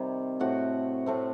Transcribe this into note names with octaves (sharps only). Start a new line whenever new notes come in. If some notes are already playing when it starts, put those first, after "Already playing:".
Already playing: C3 D#3 G3 C4 G4
A2 A3 C4 F#4 F#5
A2 A3 C4